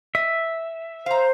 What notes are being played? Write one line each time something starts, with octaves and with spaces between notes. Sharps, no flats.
D#5 E5
C5 F5 A#5